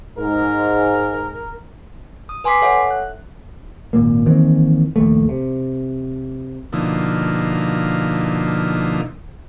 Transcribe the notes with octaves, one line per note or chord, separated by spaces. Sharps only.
G#2 A#4
D#6
B4 G#5 C6 D6 B6 C7
A4 C#5 E5 F#5
F#6
G#1 A#2 A#3
D#3 E3 A#3 C4
A#1 D#2 A3
C3
B2 D3 F3 A#3 D#4 E4